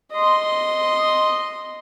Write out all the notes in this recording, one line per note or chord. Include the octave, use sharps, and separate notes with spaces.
D#5 C6